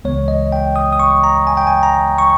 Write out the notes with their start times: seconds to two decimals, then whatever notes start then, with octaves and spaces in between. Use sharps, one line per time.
0.04 C#2 C#3 E3 G#3 B3 C#5
0.28 D#5
0.52 G5
0.76 D#6
0.92 D#6
1.00 C#6
1.24 A#5
1.47 G#5
1.57 G5
1.67 G#5
1.83 A#5
2.18 C#6